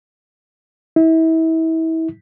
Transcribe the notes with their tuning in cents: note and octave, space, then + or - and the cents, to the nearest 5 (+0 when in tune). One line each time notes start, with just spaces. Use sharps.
E4 -30